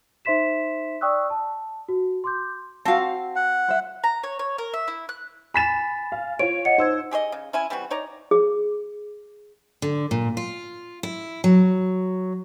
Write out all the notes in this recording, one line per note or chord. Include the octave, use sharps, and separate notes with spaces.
D#4 C5 E5 C6 B6 E7
D5 G5 C#6 D#6 E6 F#6
A5
F#4
C6 D6 G6
C4 F#4 F5 A5
F#5
C5 E5
A#5
C#5
C#5
A#4
E5
E4
F#6
G#5 B5 A6 B6 E7
F5
F4 C#5 D7
D#5 F#5 C#7
D#4 C5 E6 G#6
G4 G#4 C5 D#5
C#3
C#4 E4 G#5
E3 G3 C4 F#4
D#4 C#5 D5 A#5
G#4
D3
A#2
F4
E4
F#3